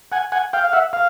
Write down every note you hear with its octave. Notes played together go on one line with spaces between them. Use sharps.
F#5 G#5
F#5 G#5
F5 G5
F5
E5 F#5
F5